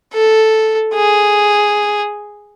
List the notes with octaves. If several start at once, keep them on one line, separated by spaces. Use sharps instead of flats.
A4
G#4